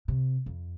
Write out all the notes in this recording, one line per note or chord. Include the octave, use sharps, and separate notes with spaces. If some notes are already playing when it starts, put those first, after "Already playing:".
C3
F2